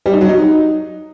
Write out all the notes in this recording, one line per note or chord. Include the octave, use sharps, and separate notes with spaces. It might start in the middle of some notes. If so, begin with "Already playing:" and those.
G3
D#4
F#3
D#4